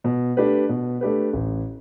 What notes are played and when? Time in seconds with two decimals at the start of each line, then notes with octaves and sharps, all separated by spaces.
0.04 B2
0.37 A3 D4 G4 B4
0.69 B2
1.01 A3 D4 G4 B4
1.33 A1